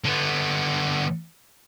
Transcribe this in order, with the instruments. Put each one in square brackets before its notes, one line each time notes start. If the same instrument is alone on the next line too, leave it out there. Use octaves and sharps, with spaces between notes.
[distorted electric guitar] D3 B3